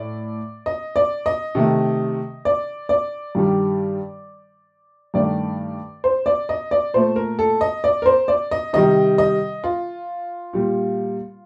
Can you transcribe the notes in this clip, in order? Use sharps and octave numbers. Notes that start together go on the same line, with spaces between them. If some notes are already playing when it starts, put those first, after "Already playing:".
Already playing: A2 A3 D5
D#5
D5
D#5
C3 D#3 A3
D5
D5
G2 D#3 G3
G2 D#3 A3 D5
C5
D5
D#5
D5
A#2 A3 C5
A#4
A4
D#5
D5
A#4
C5
D5
D#5
C3 D#3 G3 D#5
D#5
F4
A#2 G3